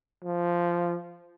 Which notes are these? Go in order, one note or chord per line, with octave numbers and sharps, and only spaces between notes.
F3